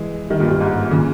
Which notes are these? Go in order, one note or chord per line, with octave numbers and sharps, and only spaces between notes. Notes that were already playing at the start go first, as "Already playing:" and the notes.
Already playing: E3 G#3
D#3 G3
G2 A#2
G2
G#2
A#2 C#3